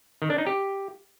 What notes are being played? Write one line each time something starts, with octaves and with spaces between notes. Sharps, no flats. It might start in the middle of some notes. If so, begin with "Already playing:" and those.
D#3
D4
D#4
G4